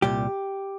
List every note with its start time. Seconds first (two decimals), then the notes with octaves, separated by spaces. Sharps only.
0.02 C2 A#2 G3 G4